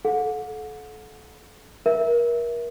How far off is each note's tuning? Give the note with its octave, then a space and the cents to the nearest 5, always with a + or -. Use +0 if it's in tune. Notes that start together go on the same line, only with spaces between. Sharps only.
A4 -35 F#5 -35
A#4 +30 E5 +0